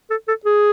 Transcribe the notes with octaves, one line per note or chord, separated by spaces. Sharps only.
A4
A4
G#4